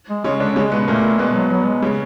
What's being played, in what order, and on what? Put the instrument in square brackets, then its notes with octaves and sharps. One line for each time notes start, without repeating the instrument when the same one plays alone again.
[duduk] G#3
[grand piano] C#3 C#4 [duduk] G#3
[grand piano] D3 D4
[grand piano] C#3 C#4 [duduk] G#3
[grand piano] B2 B3
[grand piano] A#2 A#3 [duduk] A3
[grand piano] B2 B3 [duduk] G#3
[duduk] F#3
[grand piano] B2 B3 [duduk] F#3
[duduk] G#3
[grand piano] C#3 C#4